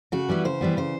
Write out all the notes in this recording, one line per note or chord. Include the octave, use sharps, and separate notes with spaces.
C#3 F#4
E3 G3 B3
C#3 C5
E3 G3 B3
C#3 C5